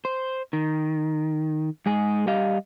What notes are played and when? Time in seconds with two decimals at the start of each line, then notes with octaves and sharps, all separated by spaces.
0.05 C5
0.53 D#3
1.86 G#2 G#3 G#4
2.27 G3 G4 D#5 F5